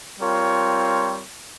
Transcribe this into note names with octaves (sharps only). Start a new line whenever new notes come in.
G3 C4 F4 A#4 C#5